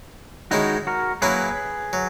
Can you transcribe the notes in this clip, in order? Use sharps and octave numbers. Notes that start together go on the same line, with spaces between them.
D#3 G#3 C#4 D#4 E4 F#4
F#4 A#4
F#3 A#3 C#4 E4 G#4 B4
F#3